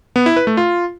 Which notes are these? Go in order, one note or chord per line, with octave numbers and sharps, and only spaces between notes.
B3
E4
B4
A3
F4